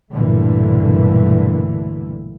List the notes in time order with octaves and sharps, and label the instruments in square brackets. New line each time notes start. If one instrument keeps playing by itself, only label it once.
[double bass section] B1 G2 A#2 D3 E3 A3